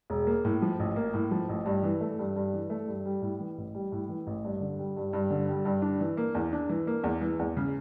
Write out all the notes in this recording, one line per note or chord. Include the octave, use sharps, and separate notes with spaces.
E1
A#3
A2
F3
A1
A#3
A2
F3
A1
G2
E3
A3
G2
G2
E3
A3
G2
G3
A2
E3
A1
G3
A2
E3
A1
G2
D3
G3
G2
G2
D3
G3
G2
D4
E3
A#3
E2
D4
E3
A#3
E2
E3
E2
C#3